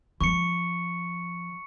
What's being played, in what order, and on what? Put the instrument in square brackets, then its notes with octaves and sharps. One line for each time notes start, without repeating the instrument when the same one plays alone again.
[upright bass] F3 [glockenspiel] C#6 C#7